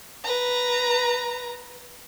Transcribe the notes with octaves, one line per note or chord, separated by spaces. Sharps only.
B4 A#5